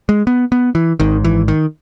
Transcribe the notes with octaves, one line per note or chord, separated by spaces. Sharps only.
G#3
B3
B3
E3
G#1 G#2 D#3
E3
D#3